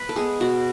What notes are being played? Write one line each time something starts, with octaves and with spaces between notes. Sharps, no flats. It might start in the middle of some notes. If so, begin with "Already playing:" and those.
Already playing: B4
A4
G#3 B3 G#4
B2 F#4